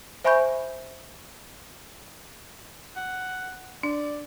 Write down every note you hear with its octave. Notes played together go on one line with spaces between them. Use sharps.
C5 E5 G#5 B5 C#6 G6
F#5
D4 D5